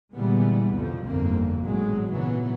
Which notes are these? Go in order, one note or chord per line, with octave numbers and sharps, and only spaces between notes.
A#2 D3 E3 G3 G#3 B3
C2 F2 B2 D3 F3
G1 F2 G#2 D3 A#3 C4
G#1 E2 A2 F#3 G#3
A#2 C#3 E3 F#3 B3